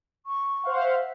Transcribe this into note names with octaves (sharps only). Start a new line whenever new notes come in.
C#6
C5 F5 F#5
E5